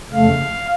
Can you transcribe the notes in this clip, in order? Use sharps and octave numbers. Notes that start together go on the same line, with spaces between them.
F2 C#3 A3 F5